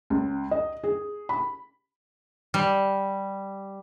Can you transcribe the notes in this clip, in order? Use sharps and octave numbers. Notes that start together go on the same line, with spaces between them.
C#2
D#5
G#4
B5
G3